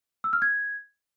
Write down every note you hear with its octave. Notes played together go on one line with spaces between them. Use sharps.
E6
F6
G#6